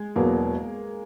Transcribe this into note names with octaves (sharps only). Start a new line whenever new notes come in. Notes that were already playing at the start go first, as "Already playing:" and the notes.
Already playing: G#3
E1 E2 B2 F#3 A#3 B3